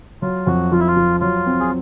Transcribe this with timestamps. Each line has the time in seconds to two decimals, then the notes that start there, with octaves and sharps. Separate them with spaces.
0.22 F#3 F4
0.47 F2 F#4
0.72 F3 F4
0.80 E4
0.88 F4
0.96 F3
1.20 F#3 F4
1.46 C4
1.60 G#4